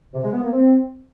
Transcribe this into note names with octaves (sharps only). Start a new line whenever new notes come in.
C3
G#3
B3
A#3
C4